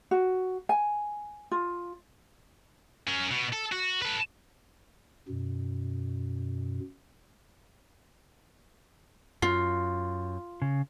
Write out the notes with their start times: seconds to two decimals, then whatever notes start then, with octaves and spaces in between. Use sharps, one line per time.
0.11 F#4
0.69 G#5
1.51 F4
3.07 C#4 A#4
3.31 B2
3.53 A4
3.72 F#4
4.02 A4 B4
5.28 F#2 B2
9.42 F#2 F4
10.62 C#3